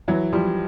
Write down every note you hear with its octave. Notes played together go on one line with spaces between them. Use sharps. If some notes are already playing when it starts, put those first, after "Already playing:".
E3 F#3
F3 G3